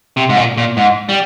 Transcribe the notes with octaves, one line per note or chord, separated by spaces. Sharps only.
C3
G#2
A#2
A#2
G#2
G3